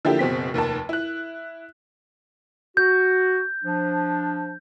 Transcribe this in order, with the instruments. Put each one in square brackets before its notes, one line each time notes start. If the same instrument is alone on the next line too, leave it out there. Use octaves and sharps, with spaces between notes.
[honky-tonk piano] D3 F3 A#3 E4 G4
F#1 B2 C4 B6
F1 D#2 D#3 A5
E4 F#6
[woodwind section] F#4 [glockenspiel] G6
[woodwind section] F3 D4